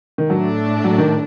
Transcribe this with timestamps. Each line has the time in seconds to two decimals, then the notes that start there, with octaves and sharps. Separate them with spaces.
0.18 D#3
0.30 A2 F#3 A3 D4
0.84 F#3
0.98 D#3